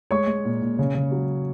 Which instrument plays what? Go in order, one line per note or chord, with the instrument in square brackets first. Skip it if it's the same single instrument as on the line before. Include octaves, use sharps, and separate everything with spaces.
[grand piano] G#3 C#5 C#6
G#3
A#2
A#2
C#3
C#3
F#3